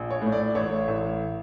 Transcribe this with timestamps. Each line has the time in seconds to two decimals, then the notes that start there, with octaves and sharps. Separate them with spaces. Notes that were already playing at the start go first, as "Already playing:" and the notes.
Already playing: A#1
0.11 C#5
0.22 A2
0.32 D5
0.55 A1 C#5
0.88 A1